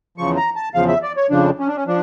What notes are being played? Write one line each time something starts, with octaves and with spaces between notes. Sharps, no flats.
E2 C#3 F3 C#6
A#5
A5
E2 C#3 F3 F5
E5
D5
C#5
F2 C#3 F3 D4
C#4
D4
C#4
F3 D4